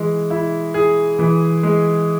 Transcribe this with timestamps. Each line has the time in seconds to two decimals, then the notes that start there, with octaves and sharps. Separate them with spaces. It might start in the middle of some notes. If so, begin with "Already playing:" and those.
Already playing: E3 G#3
0.30 E4
0.74 G#4
1.19 E3
1.63 G#3